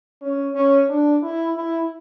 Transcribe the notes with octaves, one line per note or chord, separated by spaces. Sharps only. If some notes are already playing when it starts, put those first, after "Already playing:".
C#4
C#4
D4
E4
E4